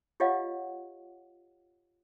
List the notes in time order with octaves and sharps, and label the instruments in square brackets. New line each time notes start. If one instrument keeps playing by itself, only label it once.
[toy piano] F4 G4 C#5 D#5 F5 F#5